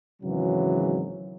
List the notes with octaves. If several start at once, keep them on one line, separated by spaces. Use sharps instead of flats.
G#1 C#3 E3 F#3